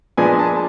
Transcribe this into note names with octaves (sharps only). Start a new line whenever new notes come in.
A#2 F3 G#3 B3 D4 G#5
A5